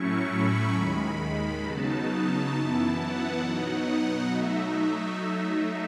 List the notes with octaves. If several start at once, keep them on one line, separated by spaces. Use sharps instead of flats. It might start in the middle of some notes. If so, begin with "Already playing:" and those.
Already playing: A2 F#3 A3 C#4 E4 C#6
B5
D#2 D#3 G#3
B5
C#3 F#3 B3 D#4 A5
F#2 E3 B3 E4
F#5
B2 F#3 B3 D#4
F#5
F#3 A3 D#4 E5